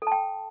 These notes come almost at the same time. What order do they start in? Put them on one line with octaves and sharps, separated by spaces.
A4 A5 G5